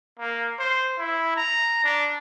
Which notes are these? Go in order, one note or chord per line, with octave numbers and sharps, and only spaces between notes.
A#3
C5
E4
A#5
D4